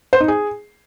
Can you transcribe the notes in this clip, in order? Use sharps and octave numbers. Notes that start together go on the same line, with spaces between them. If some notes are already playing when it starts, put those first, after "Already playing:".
C5
D#4
G#4